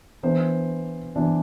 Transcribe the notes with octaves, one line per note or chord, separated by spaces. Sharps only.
E3 B3 D4 C5
E3 B3 D4